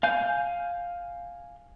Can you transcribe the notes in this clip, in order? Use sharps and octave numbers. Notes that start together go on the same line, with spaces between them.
F5 G#5 G6